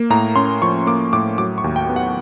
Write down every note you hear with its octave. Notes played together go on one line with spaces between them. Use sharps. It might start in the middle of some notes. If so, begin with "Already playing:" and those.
Already playing: A#3
A2 A#5
C#4 C6
F3 C#6
A#3 D6
A2 D6
F#3 D6
C#6
D#2
G5
B3
F#5